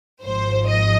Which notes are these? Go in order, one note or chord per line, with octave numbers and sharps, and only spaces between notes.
G#1 G#2 F3 C5
D#5